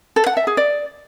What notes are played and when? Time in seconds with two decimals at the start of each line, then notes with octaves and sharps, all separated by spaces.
0.16 A4
0.26 F#5
0.37 E5
0.47 G#4
0.57 D5